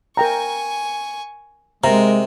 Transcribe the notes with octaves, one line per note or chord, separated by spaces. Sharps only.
A#4 G5 G#5 A#5 C#6
C3 G#3 A#4 A#5